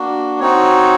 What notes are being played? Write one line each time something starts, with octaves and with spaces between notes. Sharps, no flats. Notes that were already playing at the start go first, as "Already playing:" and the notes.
Already playing: A#3 D4 F#4
C4 D#4 F#4 C#5